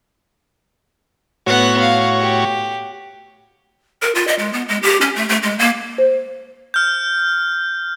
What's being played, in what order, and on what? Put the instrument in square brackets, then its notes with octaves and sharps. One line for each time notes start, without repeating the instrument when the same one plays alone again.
[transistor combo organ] A2 F#4 C#5 [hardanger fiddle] B3 F#5
[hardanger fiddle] F5
G4
[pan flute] A#4
F4
D#5
G#3
B3
G#3
G4
C#4
A3
A3
G#3
A#3
[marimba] C5
[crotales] F6 G6